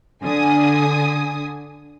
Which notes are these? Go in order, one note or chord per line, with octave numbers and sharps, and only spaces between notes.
D3 G#5 D#6